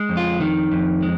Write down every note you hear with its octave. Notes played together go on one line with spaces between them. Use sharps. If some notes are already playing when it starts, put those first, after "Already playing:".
Already playing: G#3
F2
F4
D#3
F2
G#3